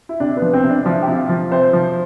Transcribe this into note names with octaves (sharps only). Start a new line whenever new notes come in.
E4
C3 D4
B3
F3
C4
C3
D4
F3 E4
G4
C3 F4
F3
C3 C5
F3